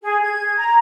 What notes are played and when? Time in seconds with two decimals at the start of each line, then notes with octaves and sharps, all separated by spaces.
0.02 G#4
0.22 G#6
0.57 A#5